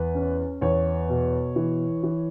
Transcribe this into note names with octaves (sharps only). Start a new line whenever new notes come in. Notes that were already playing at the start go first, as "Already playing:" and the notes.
Already playing: E2 B4
C#4
E2 C#5
B2
E3
E3